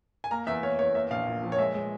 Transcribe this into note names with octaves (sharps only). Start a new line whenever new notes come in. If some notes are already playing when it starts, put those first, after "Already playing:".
G#5
A#3 A#5
E2 E5
A#3 C#5
E2 C#5
A#3 E5
A#1 F5
A#2
F3
C#5
G#3 E5
G#3